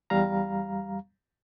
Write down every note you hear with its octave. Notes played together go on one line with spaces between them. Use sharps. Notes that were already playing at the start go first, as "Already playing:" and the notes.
E2 G3 F5 A#5